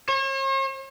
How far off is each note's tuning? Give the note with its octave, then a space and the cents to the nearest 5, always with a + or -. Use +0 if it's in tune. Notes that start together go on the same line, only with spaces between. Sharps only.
C#5 -45